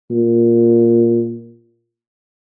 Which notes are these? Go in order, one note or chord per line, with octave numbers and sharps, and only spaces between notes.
A#2